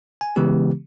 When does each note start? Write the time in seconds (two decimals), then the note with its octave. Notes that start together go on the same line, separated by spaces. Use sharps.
0.21 G#5
0.36 C#3 E3 G#3 B3 G4